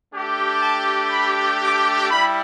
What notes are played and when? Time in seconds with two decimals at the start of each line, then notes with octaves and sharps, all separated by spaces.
0.12 A3 D4 G4
0.62 A5
1.11 B5
1.61 D6
2.10 G3 E4 B5